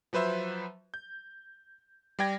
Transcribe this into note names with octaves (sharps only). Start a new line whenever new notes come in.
F3 F#3 B4 C5 E5
G6
G3 D5 G5 G#6 A#6